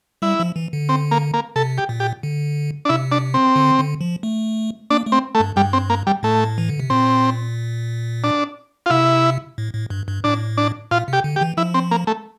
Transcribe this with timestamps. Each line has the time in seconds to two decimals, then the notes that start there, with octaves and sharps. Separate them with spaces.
0.22 G3 E4
0.40 F3
0.56 E3
0.73 D3
0.89 C4
1.11 A#3
1.34 A#3
1.56 C3 A4
1.78 G4
1.89 A#2
2.00 G4
2.23 D3
2.85 D4
2.89 C3 E4
3.12 D4
3.34 C4
3.56 D3
3.79 D3
4.01 F3
4.23 A3
4.90 A#3 D4
5.06 A3
5.12 C4
5.35 A3
5.40 G2
5.56 G2 G3
5.73 C4
5.90 A#3
6.07 G3
6.23 A2 A3
6.58 E3
6.69 D3
6.80 C3
6.90 A#2 C4
8.24 D4
8.86 F4
8.90 C3 E4
9.58 A2
9.74 A2
9.90 G2
10.08 G2
10.24 A2 D4
10.58 D4
10.91 A#2 F4
11.08 C3 G4
11.24 D3
11.36 G4
11.41 E3
11.57 F3 E4
11.74 C4
11.91 A#3
12.07 A3